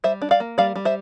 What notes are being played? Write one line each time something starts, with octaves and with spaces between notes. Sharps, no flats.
G3 C5 E5
D4
D5 F5
A#3
G3 D5 F5
G3
C5 E5